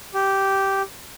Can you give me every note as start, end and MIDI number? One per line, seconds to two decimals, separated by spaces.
0.14 0.82 67